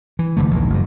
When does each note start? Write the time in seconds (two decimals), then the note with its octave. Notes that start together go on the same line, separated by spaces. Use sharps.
0.19 E3
0.37 F1 D3 A3
0.51 A#1 D#2 G#2
0.70 F#1 G2